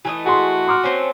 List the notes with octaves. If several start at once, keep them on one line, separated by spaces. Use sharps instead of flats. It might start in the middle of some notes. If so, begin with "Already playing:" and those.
E3 A3 D#5
F#4 G#4 C6
C6 D6 F6
A3 C4 C#4